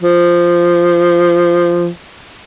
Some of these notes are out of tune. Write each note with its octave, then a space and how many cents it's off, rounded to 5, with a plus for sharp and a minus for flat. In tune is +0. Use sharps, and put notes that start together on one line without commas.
F3 -10